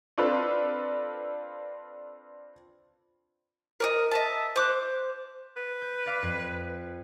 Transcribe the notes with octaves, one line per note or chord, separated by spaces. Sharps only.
C4 D4 F4 A4 B4
A#4 D5 D#5
D#5 E5 A5
C5 D6 F#6
B4
G6
D5 F5 D6
F2